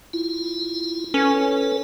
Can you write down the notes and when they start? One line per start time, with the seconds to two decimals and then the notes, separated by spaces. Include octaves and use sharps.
0.13 E4 F4
1.14 C#4 A4 B4